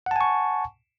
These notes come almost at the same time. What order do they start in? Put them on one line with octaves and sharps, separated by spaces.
F#5 A5 G#5 C#6